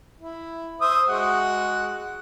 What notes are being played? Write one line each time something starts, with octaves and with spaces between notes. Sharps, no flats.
E4
C5 E5 D#6
G#3 F#4 F#5